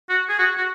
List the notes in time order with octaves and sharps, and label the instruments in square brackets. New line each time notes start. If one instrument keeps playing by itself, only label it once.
[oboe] F#4
G#4
F#4
F#4